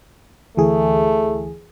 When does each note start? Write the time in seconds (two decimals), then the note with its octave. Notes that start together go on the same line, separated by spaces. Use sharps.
0.57 D2 E3 A3 G#4